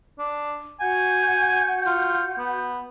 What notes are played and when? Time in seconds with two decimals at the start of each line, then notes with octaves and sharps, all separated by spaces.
0.19 D4
0.81 F#4 F#5 G#5 G6
1.86 F4
2.39 B3